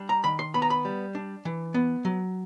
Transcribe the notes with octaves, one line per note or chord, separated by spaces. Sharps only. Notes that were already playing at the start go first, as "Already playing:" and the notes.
Already playing: G3 D4
A#5
D#3 B5
C6
B3 B5
A#5
B5
G3
D4
E3
B3
F#3